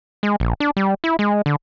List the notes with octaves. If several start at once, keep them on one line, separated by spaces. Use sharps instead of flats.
G#3
A#1
D4
G3
E4
G#3
D3